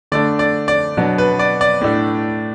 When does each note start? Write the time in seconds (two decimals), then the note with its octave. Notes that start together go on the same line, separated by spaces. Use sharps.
0.12 D3 A3 D4 D5
0.39 D5
0.68 D5
0.97 B2 F#3 B3 D4
1.18 B4
1.39 D5
1.61 D5
1.81 A2 A3 D4